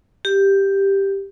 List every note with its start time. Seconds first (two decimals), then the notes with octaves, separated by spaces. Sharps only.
0.25 G4